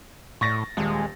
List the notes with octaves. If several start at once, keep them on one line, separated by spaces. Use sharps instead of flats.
A2 C#6 A6 A#6
D#1 G#3